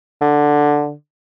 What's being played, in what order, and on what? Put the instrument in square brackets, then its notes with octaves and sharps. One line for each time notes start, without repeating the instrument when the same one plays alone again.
[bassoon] D3